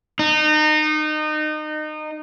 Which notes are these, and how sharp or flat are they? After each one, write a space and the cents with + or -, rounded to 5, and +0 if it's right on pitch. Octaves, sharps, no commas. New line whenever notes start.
D#4 -25